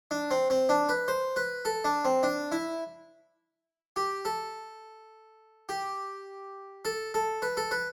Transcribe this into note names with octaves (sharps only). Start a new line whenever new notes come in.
D4
C4
C4
D4
B4
C5
B4
A4
D4
C4
D4
E4
G4
A4
G4
A4
A4
B4
A4
B4